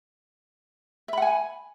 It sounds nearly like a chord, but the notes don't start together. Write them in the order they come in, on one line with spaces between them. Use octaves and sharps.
E5 B5 F#5 G#5